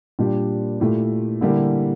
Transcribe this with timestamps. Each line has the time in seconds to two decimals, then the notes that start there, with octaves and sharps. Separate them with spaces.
0.19 A#2 G3 D4 G4
0.80 A#2 A3 E4 G4
1.41 D3 G3 A#3 E4 G4